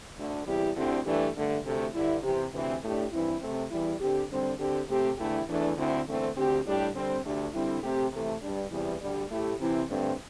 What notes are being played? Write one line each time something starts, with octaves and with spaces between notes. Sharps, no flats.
D2 D3 A3
E2 C3 G3 E4 G4
D2 D3 C4 E4 G4
G2 E3 A3 D4 G4
G2 D3 A3
D2 C3 A3
G2 D3 G3 E4
C3 E3 C4 G4
D2 C3 E3 C4
A2 A3 D4 G4
G2 E3 C4 E4
C3 A3 C4
E2 E3 G3 E4
D3 C4 G4
D3 G3 C4
D3 C4 G4
C3 A3 C4 G4
E2 D3 A3 E4 G4
E2 E3 A3 D4
D2 D3 C4 E4
E2 D3 A3 C4
D2 D3 C4 G4
A2 G3 D4 G4
D3 G3 C4
D2 D3 A3 D4 G4
D3 G3 C4 E4
C3 A3 C4 G4
C3 E3 A3
G2 G3 D4
E2 C3 E3 G3 E4
D2 D3 G3
A2 A3 E4 G4
C3 E3 C4 E4
G2 D3 A3 C4